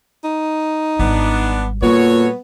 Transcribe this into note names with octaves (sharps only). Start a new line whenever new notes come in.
D#4
G#1 G3 B3 D4
A#2 G3 B3 F#4 A4 C#5